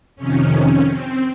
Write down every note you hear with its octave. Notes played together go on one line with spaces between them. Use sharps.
F2 C3 D#3 C#4
C4